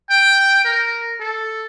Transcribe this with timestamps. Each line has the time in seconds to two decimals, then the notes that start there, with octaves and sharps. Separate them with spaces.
0.11 G5
0.65 A#4
1.21 A4